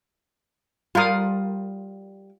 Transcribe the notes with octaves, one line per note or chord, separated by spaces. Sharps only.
G3 F4 A#4 F5 D#6